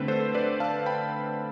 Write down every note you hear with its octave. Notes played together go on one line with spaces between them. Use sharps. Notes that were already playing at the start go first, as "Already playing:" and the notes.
Already playing: D3 A3 C4 B4
A4 C5
B4 D5
F5 A5
G5 B5